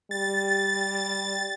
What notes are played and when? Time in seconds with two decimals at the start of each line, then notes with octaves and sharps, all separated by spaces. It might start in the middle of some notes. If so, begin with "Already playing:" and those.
0.11 G3 A6